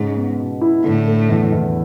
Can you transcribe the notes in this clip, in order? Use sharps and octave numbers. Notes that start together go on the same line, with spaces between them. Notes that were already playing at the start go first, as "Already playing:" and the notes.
Already playing: G#2 C#3 G#3
B3
B2
E4
A2 D3
A3
E2
E2